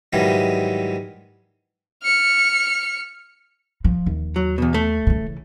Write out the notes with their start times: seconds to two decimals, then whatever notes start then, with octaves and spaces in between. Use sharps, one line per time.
0.13 G#2 D#3 E3 F#3 G3
2.03 F6 C#7
3.84 F3
4.06 D#2
4.36 F#3
4.58 E2 B2
4.74 A3
5.07 C#3 E3